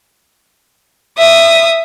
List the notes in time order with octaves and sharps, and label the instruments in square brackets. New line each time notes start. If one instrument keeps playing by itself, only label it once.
[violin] E5 D#6